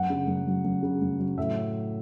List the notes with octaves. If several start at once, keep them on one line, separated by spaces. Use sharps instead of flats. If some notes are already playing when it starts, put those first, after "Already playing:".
Already playing: F#2 F#5
C#3
F#2
F#3
F#2
C#3
F#2
F#3
A2 E5